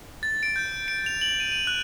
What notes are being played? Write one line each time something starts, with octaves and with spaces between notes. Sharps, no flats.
A6
D7
G6
D7
F7
F#7
D#7
D#7
F#6